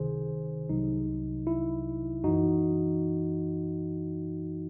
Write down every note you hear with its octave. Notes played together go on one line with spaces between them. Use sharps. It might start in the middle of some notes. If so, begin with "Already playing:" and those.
Already playing: C#2 C3 D#3 G#4 C5
C2 C3 F#3 D#4
E4
F#2 E3 D#4 F#4